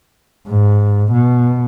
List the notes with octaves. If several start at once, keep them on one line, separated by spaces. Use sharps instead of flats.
G#2
B2